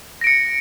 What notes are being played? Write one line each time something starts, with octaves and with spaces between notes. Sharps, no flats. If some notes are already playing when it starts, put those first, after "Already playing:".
A#6 C#7 D7